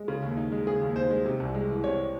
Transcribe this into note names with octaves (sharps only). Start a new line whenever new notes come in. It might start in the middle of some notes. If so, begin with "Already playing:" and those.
Already playing: G#3
C#3
D#2
D#4
G#3
C#3 G#4
D#2
D#4 C5
G#3
C3
C2
G#3
E3
C3 C#5